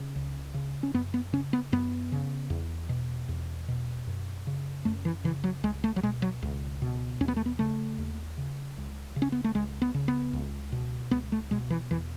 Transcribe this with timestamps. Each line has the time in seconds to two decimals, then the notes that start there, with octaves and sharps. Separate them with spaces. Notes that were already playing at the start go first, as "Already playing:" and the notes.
Already playing: C#3
0.16 C#2
0.54 C#3
0.83 C#4
0.94 F#2 B3
1.14 B3
1.33 C#3 C#4
1.53 B3
1.72 F#2 B3
2.12 C#3
2.50 E2
2.89 B2
3.28 E2
3.68 B2
4.07 F#2
4.47 C#3
4.85 F#2 A3
5.05 E3
5.24 C#3 E3
5.44 F#3
5.63 C#2 G#3
5.84 A3
5.96 F#3
6.03 B2 G#3
6.22 F#3
6.42 C#2
6.82 B2
7.21 D#2 C#4
7.28 B3
7.36 A3
7.46 B3
7.59 C#3 A3
7.98 D#2
8.38 C#3
8.78 C#2
9.16 C#3
9.22 C#4
9.32 B3
9.44 A3
9.55 C#2 G#3
9.82 B3
9.94 C#3
10.08 B3
10.33 C#2
10.72 B2
11.11 C#2 B3
11.32 A3
11.51 B2 G#3
11.70 E3
11.91 E2 E3